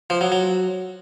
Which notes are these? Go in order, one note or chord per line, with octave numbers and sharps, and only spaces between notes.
F3
F#3
F#3